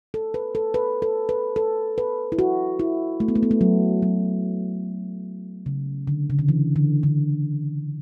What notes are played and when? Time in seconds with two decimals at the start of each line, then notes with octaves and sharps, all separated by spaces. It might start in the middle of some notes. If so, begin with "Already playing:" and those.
0.14 A4
0.34 B4
0.55 A4
0.74 B4
1.02 A4
1.29 B4
1.56 A4
1.98 B4
2.32 E4
2.39 F#4
2.79 E4
3.20 A3
3.28 B3
3.35 A3
3.43 B3
3.51 A3
3.61 F#3
4.02 F#3
5.66 C#3
6.07 D3
6.30 C#3
6.39 D3
6.49 E3
6.76 D3
7.03 D3